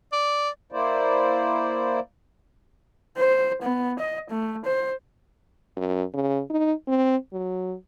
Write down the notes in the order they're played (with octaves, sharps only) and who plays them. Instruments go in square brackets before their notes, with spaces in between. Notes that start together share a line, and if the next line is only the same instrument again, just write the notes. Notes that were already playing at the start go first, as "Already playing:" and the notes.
[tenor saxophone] D5
[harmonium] A#3 E4 C5 D5
[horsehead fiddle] C5
B3
D#5
A3
C5
[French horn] F#2
C#3
D#4
C4
F#3